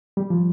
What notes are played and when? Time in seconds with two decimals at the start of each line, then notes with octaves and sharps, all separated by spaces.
0.17 G3
0.30 F3